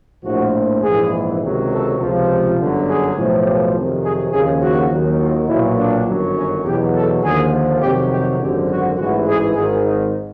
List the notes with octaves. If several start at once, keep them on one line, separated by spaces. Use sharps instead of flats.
A#1 A2 F3 F#4
A#1 G#2 E3 G#4
C#2 C3 D#3 F#3
A4
C#2 C3 F3
G1 F#2 D3 F#3
G#4
B1 A2 F3
G4
F2 C3 D#3 F#3
G#4
D#2 C#3 F3 G#4
F#4
D#2 D#3 F#3
F4
B1 A#2 F#3 E4
D4
G1 F#2 D#3 F#3
C#4
E2 B2 F#3 G4
A4
D#2 D3 F3 G#4
F2 C3 D#3 F#3 G4
G4
G#1 F#2 D3 F3 G4
F#4
A1 G#2 E3 F#4
G#4
G#1 G#2 D#3 G#4
D#4